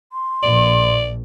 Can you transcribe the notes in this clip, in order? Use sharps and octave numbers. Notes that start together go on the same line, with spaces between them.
C6
A#1 D5